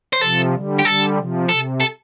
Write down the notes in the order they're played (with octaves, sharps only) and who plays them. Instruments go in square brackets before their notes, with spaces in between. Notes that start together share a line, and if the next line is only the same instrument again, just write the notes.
[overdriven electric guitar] C5
[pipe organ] C3 F3 [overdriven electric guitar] A4
[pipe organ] D3 G3
[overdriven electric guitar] G4
[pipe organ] D3 G3 [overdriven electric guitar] A4
[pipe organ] C3 F3
[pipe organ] C3 [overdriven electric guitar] A4
[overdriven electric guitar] A4